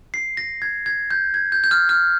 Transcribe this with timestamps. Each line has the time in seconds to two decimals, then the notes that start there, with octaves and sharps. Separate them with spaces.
0.14 C7
0.37 A#6
0.62 G#6
0.86 G#6
1.11 G6
1.34 G#6
1.52 G6
1.64 G6
1.71 F6
1.89 F6